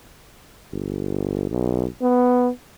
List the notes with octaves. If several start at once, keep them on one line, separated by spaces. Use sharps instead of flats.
G1
B1
B3